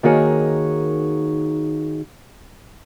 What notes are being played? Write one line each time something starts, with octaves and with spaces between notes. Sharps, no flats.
D#3 A#3 D#4 F#4 G#4 C#5